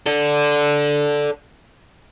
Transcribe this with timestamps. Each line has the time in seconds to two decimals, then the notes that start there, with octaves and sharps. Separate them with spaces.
0.06 A4 D5